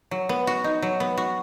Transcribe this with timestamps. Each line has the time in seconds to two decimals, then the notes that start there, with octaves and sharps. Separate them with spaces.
0.11 F#3
0.29 B3
0.47 F#4
0.64 D#4
0.82 F#3
1.00 B3
1.17 F#4